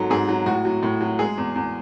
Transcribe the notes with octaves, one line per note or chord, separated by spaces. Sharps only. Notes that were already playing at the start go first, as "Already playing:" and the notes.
Already playing: G#2 F#3 A4
G#2 G#4
F#3
A2 F#4
F#3
A2
F#3
G#3 G#4
E2
E2